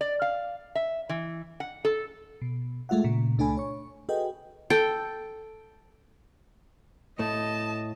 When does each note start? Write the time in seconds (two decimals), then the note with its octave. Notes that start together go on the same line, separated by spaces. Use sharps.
0.01 D5
0.22 F5
0.75 E5
1.09 E3
1.60 F#5
1.85 A4
2.42 B2
2.89 G#3 A3 F4 E5 F#5
3.04 A#2 C#3
3.38 C#2 A3 D4 A4 G#5 B5
3.57 C#5 C#6
4.09 F#4 G#4 A4 B4 D#5 G5
4.70 A4 G5
7.19 A2 A3 D#5 A5